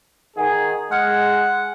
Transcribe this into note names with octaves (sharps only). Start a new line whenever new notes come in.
D#3 G#4 F#5 G#5
G#3 F#5 F6 G#6 C#7